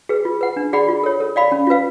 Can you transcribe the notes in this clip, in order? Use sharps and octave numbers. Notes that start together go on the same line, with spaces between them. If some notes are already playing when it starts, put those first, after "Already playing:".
G#4 B4
F4
B4 F#5
D4
G#4 D5 F#5 B5
F4
A4 C#5
A4
D5 F5 B5
C#4
F4 B4 F5